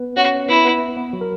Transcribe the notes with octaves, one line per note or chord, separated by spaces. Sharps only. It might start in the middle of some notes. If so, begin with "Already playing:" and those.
Already playing: B3 B4
C#4 F#4 C#5
B3 E4 B4
B3 B4
B3
F#3 F#4
A#4